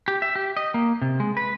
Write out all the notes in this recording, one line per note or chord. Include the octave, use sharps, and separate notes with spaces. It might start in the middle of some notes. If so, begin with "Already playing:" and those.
G4
E5
G4
D#5
A#3
C3
G#3
B4